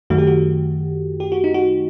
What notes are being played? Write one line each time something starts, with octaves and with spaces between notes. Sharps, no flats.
F#2 D#3 A3 F#4
G4
F#4
G4
F#4
D#4
F#4